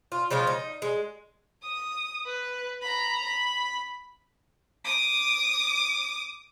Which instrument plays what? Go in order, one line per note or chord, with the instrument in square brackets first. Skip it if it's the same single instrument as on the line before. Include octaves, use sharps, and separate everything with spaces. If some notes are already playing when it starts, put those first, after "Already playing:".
[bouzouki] F4
C#3 F3 G#3 F4
D#4
G#3
[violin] D#6
B4
A#5 B5
B5
D6 D#6